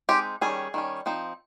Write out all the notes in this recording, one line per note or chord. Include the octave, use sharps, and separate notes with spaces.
G#3 C4 D#4 G4
D#3 G3 C#4 G#4
D#3 G3 C#4
F3 C4 D#4